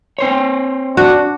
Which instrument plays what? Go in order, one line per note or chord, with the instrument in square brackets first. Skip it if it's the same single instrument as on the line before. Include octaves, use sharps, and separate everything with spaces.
[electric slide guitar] C4 C5 C#5
[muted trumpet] D4 [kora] F#4